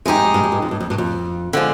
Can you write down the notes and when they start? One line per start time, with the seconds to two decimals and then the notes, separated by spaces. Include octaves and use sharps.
0.06 F2 G#3 D#4 G4
0.16 G2
0.24 F2
0.34 G2
0.44 F2
0.52 G2
0.62 F2
0.71 G2
0.80 F2
0.90 G2
0.98 F2
1.53 D3 F3 G#3